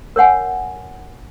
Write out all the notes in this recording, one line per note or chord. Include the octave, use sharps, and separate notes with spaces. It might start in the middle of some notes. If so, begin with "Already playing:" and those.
A#4 C#5 F#5 G#5